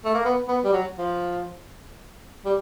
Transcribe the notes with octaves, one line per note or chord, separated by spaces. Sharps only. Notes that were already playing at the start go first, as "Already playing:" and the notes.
A3
A#3
B3
B3
G3
F#3
F3
G3